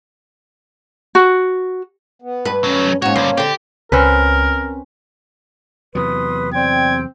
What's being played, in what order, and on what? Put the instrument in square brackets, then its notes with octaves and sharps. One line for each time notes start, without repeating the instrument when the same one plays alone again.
[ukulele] F#4
[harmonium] B3
[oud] G2 B4
[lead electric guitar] F#3 A3 [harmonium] C#4
[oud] G#2 F#4 [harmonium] A#3 C#4 [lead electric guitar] C#5
[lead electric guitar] C#2 D3 [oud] G2 C5
[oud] D3 C4 [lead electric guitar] G4
[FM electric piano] C#2 [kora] C4 C#4 B4 [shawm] A#4
[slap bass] E2 C3 F#3 [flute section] B4 C6 D#6
[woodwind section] C4 G5 [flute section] D5 [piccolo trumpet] G#6